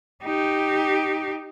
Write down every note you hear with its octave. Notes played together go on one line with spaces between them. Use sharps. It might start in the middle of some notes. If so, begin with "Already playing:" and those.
D#4 G4